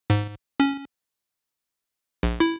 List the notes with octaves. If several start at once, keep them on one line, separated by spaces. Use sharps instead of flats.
G#2
C#4
A#1
E4